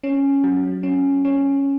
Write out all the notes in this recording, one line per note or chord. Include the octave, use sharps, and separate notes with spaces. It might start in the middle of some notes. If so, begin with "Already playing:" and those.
C#4
F#3
C#4
C#4